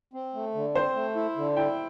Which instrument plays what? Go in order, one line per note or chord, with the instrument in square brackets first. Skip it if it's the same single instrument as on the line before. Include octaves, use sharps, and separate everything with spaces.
[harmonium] C4
A3
D3
[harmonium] C4 [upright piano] C5
[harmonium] A3
E4
D3
[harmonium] E4 [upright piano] G5